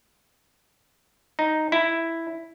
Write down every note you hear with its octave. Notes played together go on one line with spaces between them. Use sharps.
D#4
E4